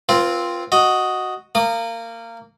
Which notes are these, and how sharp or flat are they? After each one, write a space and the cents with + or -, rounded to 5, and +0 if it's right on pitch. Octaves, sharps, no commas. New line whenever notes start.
C4 +0 F4 +0 B4 -45
F#4 +0 D#5 +0
A#3 -20 D#6 -35